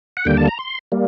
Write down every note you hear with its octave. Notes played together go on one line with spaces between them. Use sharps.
F#5
D#2 D3 G3 A#3 G5
A5
A#5
C6
G3 A#3